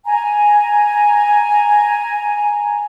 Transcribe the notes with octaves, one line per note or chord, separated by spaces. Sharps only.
G#5 A#5